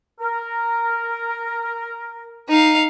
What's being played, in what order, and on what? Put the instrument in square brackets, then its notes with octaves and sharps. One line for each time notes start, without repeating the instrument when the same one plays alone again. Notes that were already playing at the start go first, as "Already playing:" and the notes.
[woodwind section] A#4
[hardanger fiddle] D#4 F5